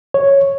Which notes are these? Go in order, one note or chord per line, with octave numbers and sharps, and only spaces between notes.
C#5